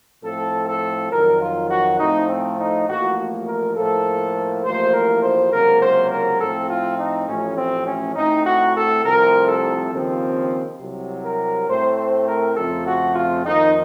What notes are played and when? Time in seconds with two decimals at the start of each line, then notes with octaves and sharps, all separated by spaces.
0.23 A2 F3 C4 A4
0.68 A4
1.12 F2 D#3 F#3 A#4
1.41 F4
1.70 F#4
2.00 A2 F3 A3 C4 D#4
2.29 C4
2.59 D#4
2.88 A1 A2 F3 A#3 F#4
3.47 A#4
3.76 A2 F3 A#3 A4
4.64 A1 A2 F3 A#3 C5
4.93 A#4
5.22 C5
5.52 C#2 C3 F#3 A#3 A#4
5.81 C5
6.11 A#4
6.40 A2 F3 C4 A4
6.69 F4
6.99 D#4
7.28 A1 A2 F3 A3 C#4
7.57 C4
7.87 C#4
8.16 A2 A3 C4 D#4
8.46 F#4
8.76 A4
9.04 C2 C3 F3 A3 C4 A#4
9.48 A4
9.92 D#2 C#3 F3 C4
10.80 C2 C3 F#3
11.25 A#4
11.68 A2 A3 C4 C5
11.98 C5
12.27 A#4
12.57 F2 C#3 F3 A3 C4 A4
12.86 F#4
13.15 F4
13.45 F2 D#3 A#3 D#4